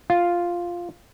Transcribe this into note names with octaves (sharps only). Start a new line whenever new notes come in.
F4